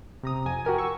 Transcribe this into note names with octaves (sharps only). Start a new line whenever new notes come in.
C3 A#5 D#6
F2 G#5
F#4 G4 A#4 G#5
C#6 E6